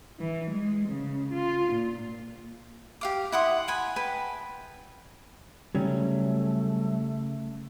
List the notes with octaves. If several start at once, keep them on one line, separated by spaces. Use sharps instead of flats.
E3
G#3
C#3
F4
A#2
G4 F5 D6
E4 F#5 C6 D#6
F#5 G#5 B5
B4 G5 A5
C#3 F#3 G3 A3 C#4